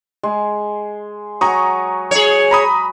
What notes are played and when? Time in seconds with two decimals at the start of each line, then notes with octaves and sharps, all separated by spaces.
0.23 G#3
1.41 F#3 G#5 A#5 C#6 D#6
2.11 G#4 C#5
2.51 A#5 B5 D#6